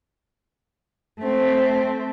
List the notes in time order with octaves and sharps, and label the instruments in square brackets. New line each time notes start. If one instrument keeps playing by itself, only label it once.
[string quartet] A3 C4